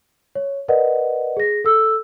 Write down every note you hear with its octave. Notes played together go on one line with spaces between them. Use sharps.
C#5
A#4 B4 D5 D#5 F#5
G#4 A#6
A4 E6